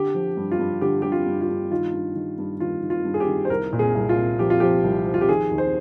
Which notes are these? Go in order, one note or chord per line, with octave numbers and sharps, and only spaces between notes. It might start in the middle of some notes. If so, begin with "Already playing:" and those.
Already playing: D3 G4
F3
G2
F4
G2
D3 G4
G2 G4
F4
G2
F4
G2
D#3 F4
G2
D#3
G2
D#3 F4
D#3
F4
G2
G#4
G4
D#3
C5
C2 A#4
A#2
G#4
C2
F4
A#2
F3 G4
F4
F3 G4
C2
F3
F4
G4
D#3 G#4
D#2
C5